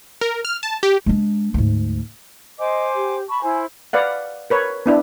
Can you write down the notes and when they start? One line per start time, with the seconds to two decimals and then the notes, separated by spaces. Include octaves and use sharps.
0.21 A#4
0.45 F6
0.63 A5
0.83 G4
1.06 G#3 D4
1.54 D2 G#2
2.59 C5 D#5 G#5 D6
2.95 G4
3.29 A5 B5 C#6
3.42 E4 C5 G#5
3.93 B4 D5 F5 F#5
4.50 A#4 B4 C#5
4.86 B3 D4 E4 B4